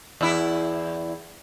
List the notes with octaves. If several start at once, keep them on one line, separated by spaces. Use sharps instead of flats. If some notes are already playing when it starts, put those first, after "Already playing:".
E2 E4